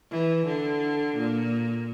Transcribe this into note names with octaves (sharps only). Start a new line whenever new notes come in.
E3
D3
A#2